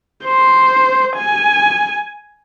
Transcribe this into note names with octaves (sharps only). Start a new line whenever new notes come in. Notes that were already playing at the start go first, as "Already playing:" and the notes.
C5
G#5